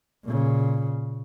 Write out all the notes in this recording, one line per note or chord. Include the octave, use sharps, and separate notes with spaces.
A#2 C#3